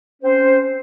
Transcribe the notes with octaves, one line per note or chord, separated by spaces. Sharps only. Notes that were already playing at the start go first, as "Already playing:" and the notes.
C4 C#4 C5